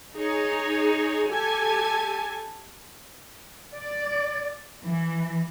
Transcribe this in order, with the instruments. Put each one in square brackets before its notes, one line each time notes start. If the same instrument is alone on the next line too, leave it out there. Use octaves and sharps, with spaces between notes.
[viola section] D#4 G#4 C#5
G4 A4 G#5 A5
[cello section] D5
E3